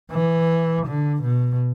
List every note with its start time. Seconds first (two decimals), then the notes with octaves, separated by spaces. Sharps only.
0.12 E3
0.86 D3
1.23 B2